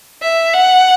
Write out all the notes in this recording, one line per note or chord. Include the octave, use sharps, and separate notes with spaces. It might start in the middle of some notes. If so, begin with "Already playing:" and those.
E5
F#5